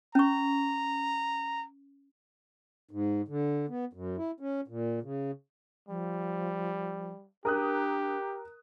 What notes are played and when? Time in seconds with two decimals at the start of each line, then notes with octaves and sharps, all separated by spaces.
0.15 C#4 A#5 C#6
2.91 G#2
3.28 D3
3.69 B3
3.93 F#2
4.17 E4
4.40 C#4
4.68 A#2
5.03 C#3
5.89 F3 G3
7.45 D4 G4 A#4 D#6 F#6